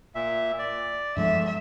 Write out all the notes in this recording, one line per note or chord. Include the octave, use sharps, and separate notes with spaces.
A#2 E5
D5
E2 G2 D3 F3 G#3 E5